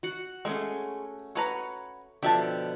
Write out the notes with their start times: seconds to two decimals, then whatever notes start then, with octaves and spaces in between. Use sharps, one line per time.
0.03 F#4 F#5
0.45 G#3 A3 C#4 G#4
1.35 F#4 B4 C#5 A#5
2.23 B2 D3 F3 G4 E5 A5